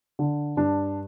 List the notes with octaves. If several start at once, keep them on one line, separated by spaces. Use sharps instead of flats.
D3
G2 D4